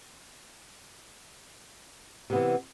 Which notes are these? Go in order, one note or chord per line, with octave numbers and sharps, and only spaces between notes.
C3 E3 B3